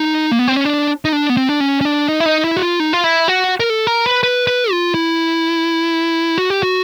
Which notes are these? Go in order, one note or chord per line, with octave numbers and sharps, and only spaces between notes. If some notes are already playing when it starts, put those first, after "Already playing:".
Already playing: D#4
A#3
B3
C4
C#4
D4
D#4
D4
B3
C4
D4
C#4
C#4
D4
D#4
E4
D#4
E4
F#4
F4
D#4
F4
E4
F#4
A#4
A4
A#4
B4
B4
B4
F4
E4
F#4
G4
F#4